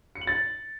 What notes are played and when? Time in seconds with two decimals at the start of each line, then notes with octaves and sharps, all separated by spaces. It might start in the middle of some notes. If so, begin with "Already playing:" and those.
0.15 C#7
0.21 F#7
0.27 A6